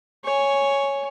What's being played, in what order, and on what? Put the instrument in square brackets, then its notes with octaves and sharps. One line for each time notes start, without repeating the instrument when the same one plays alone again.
[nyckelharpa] C#5 G#5